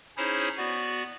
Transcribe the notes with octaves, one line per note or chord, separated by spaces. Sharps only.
C#4 D#4 E4 G#4 C5 C#5
B3 F#4 D5